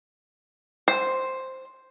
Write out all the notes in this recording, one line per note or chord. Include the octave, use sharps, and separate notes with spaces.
C5